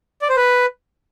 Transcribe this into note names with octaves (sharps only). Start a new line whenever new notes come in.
D5
C5
B4